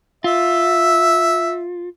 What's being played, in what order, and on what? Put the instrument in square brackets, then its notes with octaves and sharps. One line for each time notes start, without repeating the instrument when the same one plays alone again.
[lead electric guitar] F4 [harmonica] E5